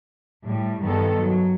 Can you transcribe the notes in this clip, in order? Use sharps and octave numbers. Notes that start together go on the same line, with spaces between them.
A2 G3
G2 D#3 G3 B3 A4
F#3